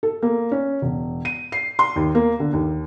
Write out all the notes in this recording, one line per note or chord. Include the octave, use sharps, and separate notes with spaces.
A4
A#3
C#4
E1
D#7
C7
C6
D#2
A#3
D3
D#2